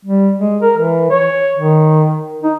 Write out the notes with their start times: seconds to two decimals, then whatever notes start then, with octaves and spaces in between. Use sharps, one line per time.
0.05 G3
0.38 G#3
0.62 A#4
0.77 E3
1.11 C#5
1.57 D#3
2.43 D#4